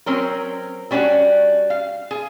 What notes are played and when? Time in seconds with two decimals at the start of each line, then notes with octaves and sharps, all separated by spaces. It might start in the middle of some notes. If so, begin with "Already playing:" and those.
0.06 F#3 C4 C#4 A#4
0.91 G3 C#4 D4 F#4
1.70 F5
2.11 G#4